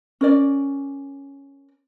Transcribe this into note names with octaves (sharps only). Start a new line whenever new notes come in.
C#4 A#4 D5